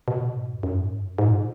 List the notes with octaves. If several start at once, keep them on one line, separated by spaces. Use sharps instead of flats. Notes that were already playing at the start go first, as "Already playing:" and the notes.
B2
A#2
G#2
F2
F#2
G#2
F#2
G#2
A#2